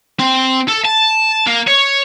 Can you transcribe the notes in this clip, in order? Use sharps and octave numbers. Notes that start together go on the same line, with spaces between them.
C4
A4
A5
A#3
C#5